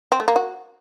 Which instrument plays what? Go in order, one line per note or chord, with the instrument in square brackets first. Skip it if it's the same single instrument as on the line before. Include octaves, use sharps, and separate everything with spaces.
[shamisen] C4
A3
A#3
F#4